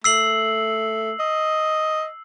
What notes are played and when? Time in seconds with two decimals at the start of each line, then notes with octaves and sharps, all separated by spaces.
0.04 A3 E6 C7 F#7
1.20 D#5